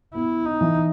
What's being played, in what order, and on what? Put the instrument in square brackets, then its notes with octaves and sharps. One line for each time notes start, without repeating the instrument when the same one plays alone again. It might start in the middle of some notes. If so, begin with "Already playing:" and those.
[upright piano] B3 [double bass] E4
[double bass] D#4
[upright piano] E3